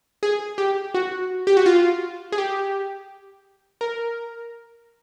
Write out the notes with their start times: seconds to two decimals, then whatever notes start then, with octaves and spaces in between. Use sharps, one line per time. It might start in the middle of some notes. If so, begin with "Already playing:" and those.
0.23 G#4
0.58 G4
0.94 F#4
1.47 G4
1.57 F#4
1.66 F4
2.32 G#4
2.38 G4
3.81 A#4